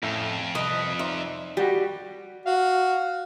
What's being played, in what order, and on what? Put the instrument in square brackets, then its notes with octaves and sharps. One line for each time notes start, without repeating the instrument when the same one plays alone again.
[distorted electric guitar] F2 [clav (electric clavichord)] A2 C#4 E5
[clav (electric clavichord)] C2 [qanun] B4 D#5
[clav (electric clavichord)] D#4 C5 D5 [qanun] E5
[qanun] G3 [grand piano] F#4 G4
[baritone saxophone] F#4 [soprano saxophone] F5